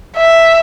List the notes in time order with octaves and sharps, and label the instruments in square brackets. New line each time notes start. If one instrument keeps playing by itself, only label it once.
[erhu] E5